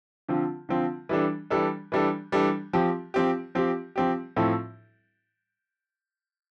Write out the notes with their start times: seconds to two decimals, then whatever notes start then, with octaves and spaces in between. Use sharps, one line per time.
0.28 D3 F3 C4 F4
0.69 D3 F3 C4 F4
1.09 E3 G3 D4 A4
1.50 E3 G3 D4 A4
1.92 E3 G3 D4 A4
2.32 E3 G3 D4 A4
2.73 F3 C4 G4
3.14 F3 C4 G4
3.55 F3 C4 G4
3.96 F3 C4 G4
4.36 A2 F3 C4 E4 A4